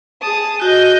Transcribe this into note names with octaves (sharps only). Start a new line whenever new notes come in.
G#4 A5 D#6
F#4 D#5 G6